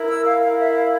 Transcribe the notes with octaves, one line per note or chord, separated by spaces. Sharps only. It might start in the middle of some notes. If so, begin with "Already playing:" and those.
Already playing: E4 A#4
E6
F5
E4 A#4 F5
E5
F5